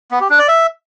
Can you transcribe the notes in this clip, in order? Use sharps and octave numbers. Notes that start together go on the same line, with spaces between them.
B3
G4
D4
D5
E5